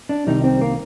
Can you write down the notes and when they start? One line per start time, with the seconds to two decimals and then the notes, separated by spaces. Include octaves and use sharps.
0.09 D4
0.27 C2 C3 D#3 G3 D#4
0.44 C4
0.61 A#3